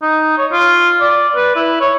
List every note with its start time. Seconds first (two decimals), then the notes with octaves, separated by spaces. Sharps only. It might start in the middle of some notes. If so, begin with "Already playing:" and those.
0.03 D#4
0.38 C#5
0.52 F4
1.01 D5
1.36 B4
1.56 E4
1.81 C#5